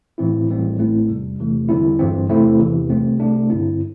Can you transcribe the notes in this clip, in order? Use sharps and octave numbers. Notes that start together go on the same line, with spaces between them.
A2 E3 C4 E4
A1 A2 E3 G3 C4
A1 A2 A3 C4 E4
E2 C3 G3
E2 C3 E3 A3
E2 D3 G3 C4 E4
G1 G2 E3 C4
E2 C3 A3 C4 E4
E2 C3 E3
C2 C3 A3 C4
C2 C3 A3 D4
G2 D3 C4 E4